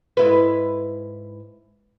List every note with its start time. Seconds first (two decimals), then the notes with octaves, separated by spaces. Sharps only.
0.17 G#2 E4 B4